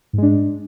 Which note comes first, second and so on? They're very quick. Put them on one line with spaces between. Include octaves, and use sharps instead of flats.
G#2 G#3 D4